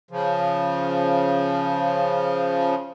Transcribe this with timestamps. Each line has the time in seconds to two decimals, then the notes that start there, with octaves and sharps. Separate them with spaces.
0.11 C#3 F3